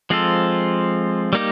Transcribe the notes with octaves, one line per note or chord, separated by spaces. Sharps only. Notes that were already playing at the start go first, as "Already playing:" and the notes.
F3 G#3 C4 F4 A4
G3 A#3 D#4 G4